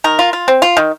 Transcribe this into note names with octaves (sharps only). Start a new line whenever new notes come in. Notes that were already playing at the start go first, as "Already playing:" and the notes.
D#3 A#4
F4
F4
C4
F4
D#3